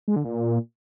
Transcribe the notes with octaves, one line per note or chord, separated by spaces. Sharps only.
G#3
D3
A#2